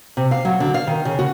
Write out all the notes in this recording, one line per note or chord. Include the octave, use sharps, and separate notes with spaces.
C3
F5
F#3
D3
F5
D#3
C#3
F#4